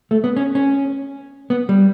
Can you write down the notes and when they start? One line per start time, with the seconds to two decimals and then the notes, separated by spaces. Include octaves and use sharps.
0.11 A3
0.24 B3
0.37 C#4
0.55 C#4
1.50 B3
1.69 G3